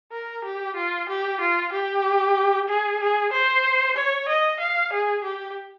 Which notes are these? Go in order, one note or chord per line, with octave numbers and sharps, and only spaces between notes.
A#4
G4
F4
G4
F4
G4
G#4
G#4
C5
C#5
D#5
F5
G#4
G4